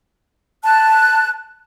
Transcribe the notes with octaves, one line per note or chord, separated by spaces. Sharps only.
A5 F#6